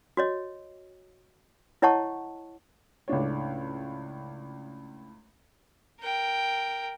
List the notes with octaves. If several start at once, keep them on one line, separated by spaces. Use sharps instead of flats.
F#4 C#5 D#5
E4 C#5 D#5 F#5 A5 C#6
C#2 A2 D4 C#5
A#4 G5